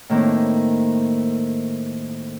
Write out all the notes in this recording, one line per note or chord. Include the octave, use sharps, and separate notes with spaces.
A2 D#3 A#3 C4